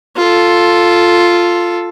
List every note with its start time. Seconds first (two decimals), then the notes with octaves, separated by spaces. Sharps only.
0.17 F4 A4